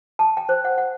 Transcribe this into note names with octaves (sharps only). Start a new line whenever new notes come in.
A5
G5
C5
F#5
F#5